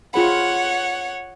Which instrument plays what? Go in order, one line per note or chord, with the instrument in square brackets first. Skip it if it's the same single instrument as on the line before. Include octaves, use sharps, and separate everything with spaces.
[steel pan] F4 G#4 B5 [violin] C#5 F#5